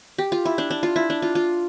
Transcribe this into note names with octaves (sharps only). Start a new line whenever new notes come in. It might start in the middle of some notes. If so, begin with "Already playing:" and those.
G4
F4
E4
D4
D4
F4
E4
D4
F4
F4